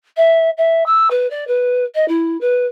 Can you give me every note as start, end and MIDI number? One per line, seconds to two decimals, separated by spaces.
0.17 0.50 76
0.58 0.86 76
0.86 1.08 88
1.11 1.29 71
1.31 1.47 74
1.48 1.85 71
1.95 2.08 75
2.08 2.39 64
2.41 2.66 71